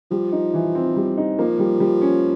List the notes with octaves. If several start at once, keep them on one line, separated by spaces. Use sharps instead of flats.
F3 G3
D#4
E3
C4
G3
D#4
F3 A#3
G3
G3
C#4